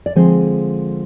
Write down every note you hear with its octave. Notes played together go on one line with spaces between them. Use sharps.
D5
D3 F3 G#3 C4 G#4 C5